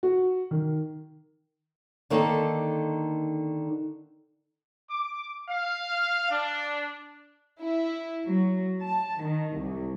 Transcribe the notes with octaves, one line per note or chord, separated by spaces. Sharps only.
F#4
D#3
D3 D#3 A#3 D#4 A4
D6
F5
D4
E4
F#3
A5
D#3
C2